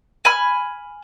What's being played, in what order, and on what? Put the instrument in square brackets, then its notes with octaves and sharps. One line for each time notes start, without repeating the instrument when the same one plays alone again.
[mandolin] G#5 B5 F6